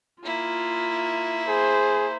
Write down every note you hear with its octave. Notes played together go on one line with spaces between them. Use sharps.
A#3 E4 F4
G#4 C5